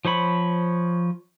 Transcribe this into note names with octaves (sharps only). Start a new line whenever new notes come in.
F3 C5 C#5 B5